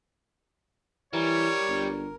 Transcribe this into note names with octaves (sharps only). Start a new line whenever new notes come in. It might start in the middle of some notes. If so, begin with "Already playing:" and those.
E3 G3 A#4 C#5
G1